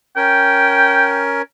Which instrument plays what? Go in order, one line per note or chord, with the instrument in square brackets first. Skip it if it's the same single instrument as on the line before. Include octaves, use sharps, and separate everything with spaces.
[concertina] C#4 A#4 [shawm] G5